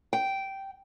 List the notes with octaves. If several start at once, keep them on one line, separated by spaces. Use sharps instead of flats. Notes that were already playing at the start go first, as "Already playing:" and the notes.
G5